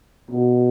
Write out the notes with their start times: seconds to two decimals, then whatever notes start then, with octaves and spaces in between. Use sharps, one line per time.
0.31 B2